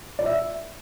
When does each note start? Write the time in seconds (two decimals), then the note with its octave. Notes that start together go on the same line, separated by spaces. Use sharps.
0.19 D5
0.26 E5